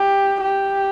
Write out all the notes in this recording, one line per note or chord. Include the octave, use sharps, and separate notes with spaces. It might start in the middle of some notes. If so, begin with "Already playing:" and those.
Already playing: G4
G4